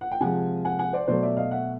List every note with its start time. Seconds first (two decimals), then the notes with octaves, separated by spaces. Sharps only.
0.01 F#5
0.11 G5
0.21 C3 F3 G#3 F#5 G#5
0.65 F#5 G#5
0.79 F#5 G#5
0.93 C5 D5
1.08 B2 F#3 A3 C5 D5
1.23 D5 E5
1.37 D#5 F5
1.51 E5 F#5